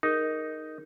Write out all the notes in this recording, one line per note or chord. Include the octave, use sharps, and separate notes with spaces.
D#4 G#4 A#4